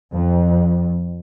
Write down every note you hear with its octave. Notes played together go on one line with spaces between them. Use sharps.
F2